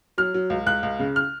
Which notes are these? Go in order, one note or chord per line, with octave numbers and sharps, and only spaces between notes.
F#3 F6
F#3
C#2
C#2 F#6
C#2
C#3
F6